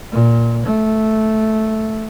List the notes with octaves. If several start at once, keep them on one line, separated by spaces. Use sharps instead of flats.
A#2
A3